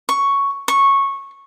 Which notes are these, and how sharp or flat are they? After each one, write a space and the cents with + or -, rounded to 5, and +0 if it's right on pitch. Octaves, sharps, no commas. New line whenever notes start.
C#6 +5
C#6 -10